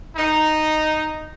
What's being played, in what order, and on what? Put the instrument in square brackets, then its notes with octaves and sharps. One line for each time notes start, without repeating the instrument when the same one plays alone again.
[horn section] D#4